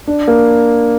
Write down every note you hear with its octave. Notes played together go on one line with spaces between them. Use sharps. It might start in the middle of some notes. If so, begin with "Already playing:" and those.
D4
A#3